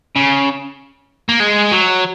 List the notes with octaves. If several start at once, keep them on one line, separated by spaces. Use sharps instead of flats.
C#3
A#3
G#3
F#3